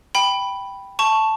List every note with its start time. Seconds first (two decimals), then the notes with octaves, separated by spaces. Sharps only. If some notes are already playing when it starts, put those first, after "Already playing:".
0.15 G5 B5
0.99 A5 C#6